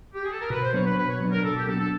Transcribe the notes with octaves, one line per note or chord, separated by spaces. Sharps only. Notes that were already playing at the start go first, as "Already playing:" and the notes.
G4
G#4
A4
A#4
B2 B4
C5
F#3 B3 D4 C#5
B4
B2 B4
C#5
F#3 B3 D4
A#4
B2 A4
G4
F#3 B3 D4 A4
A4